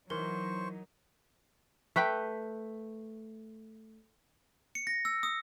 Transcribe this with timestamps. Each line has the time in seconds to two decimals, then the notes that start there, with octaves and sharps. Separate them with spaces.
0.10 E3 F#3 D#4 A#4 C5 C#6
1.96 A3 B4 G5
4.75 C#7
4.87 A#6
5.05 E6
5.23 D#6